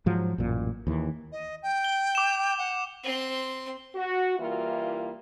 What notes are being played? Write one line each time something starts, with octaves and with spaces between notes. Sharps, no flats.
G#2 F3 F#3
A1 F#2 A#2
D#2 E3
D#5
G5
G7
D6 E7
F#5
C4 C6
F#4
E3 G3 A#3 E4 F4